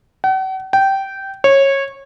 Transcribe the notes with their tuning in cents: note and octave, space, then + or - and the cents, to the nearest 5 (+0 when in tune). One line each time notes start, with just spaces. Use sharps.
F#5 +45
G5 -15
C#5 -20